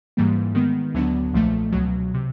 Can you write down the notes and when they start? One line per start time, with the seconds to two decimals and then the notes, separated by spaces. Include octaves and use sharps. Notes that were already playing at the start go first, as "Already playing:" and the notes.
0.17 G#2 E3 G3 A#3
0.55 D#3 G#3 B3
0.94 D2 D3 F#3 B3 D4
1.33 B1 A#2 F3 A3
1.72 C#2 B2 F#3
2.14 C3